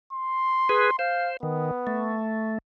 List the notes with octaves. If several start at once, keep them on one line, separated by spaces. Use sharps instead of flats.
C6
G#4 B4
C5 F5
D#3 B3
A3